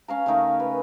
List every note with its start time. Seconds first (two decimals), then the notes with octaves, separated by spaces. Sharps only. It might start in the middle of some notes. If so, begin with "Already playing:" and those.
0.08 C#4 F5 A#5
0.26 C#3 A3 D#4 A#4
0.60 B4